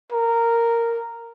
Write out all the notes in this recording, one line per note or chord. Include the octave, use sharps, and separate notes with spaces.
A#4